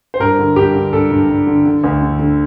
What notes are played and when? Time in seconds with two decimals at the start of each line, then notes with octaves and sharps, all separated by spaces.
0.14 C5
0.20 G2 A#4
0.39 D3
0.56 G2 G4
0.74 D3
0.93 G2 A4
1.11 G2
1.29 G2
1.47 D3
1.66 D3
1.84 D2
2.01 D3
2.19 D3